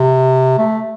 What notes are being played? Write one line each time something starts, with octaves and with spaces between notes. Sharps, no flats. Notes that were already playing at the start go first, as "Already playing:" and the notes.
Already playing: C3
A3